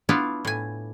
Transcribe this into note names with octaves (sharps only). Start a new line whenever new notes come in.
B3 D4 E4 F4
A2 G#5